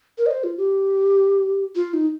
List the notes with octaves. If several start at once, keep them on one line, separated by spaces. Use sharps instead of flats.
A#4
D#5
C5
F4
G4
F4
D#4